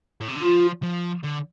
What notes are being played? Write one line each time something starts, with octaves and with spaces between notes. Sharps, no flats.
A2
C3
D3
F3 F4
F3
D3